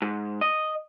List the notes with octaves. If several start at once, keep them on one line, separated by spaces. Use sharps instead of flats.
G#2
D#5